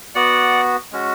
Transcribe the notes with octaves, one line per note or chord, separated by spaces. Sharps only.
B3 F#4 D5 F#5
G#3 C#4 F#4